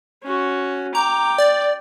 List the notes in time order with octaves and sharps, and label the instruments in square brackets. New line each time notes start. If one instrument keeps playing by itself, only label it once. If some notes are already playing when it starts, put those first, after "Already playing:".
[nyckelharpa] C#4 F#4
[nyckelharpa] G5 D6 [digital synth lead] A#5
[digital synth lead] D5